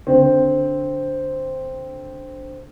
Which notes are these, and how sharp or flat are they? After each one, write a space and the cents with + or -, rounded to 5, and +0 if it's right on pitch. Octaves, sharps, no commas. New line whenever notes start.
D3 +0 C4 +0